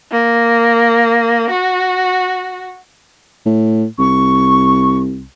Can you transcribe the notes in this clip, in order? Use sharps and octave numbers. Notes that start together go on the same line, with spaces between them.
A#3
F#4
A2
C2 C#6